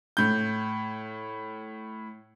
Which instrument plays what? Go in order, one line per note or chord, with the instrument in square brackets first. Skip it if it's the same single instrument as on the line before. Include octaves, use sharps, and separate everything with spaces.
[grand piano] A2 G6